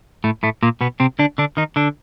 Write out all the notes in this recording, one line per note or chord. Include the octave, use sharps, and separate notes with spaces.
A2 A3
A2 A3
A#2 A#3
B2 B3
C3 C4
D3 D4
D3 D4
D#3 D#4
D3 D4